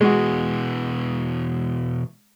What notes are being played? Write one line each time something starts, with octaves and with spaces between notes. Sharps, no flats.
B2 E3 G#3 F#4